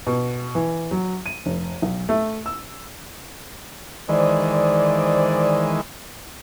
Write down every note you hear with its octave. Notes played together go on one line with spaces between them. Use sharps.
B2
E3
F#3
D#7
F1
B1
A3
E6
D#3 E3 G#3 C5 D5